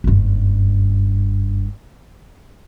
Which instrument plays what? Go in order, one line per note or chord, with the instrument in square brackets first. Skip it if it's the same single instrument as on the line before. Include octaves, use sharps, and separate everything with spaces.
[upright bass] F#1 G2